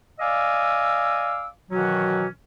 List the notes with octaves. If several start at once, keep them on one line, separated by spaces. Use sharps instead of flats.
D5 D#5 F5 G#5 D6 E6
B2 D#3 E3 F#3 C#4 F#4